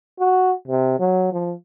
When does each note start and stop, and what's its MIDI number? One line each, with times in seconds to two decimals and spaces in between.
0.19 0.52 66
0.68 0.97 48
0.99 1.30 54
1.32 1.53 53